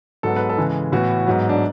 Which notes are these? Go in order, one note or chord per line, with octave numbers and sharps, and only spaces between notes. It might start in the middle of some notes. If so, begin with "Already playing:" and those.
G#2 F#3 B3 A4
B4
A4
C#3 E3 G#3
A2 E3 B3 F#4
G#2 F#3 B3
D4